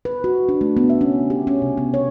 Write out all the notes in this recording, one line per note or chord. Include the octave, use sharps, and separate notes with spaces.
B4
F#4
D4
A3
B3
E5
C#4
G4
C#4
C3
B3
C#5